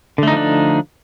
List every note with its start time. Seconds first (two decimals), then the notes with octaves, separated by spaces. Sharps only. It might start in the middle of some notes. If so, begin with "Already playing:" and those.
0.18 D3
0.23 A3
0.27 D#4
0.32 F3
0.37 D4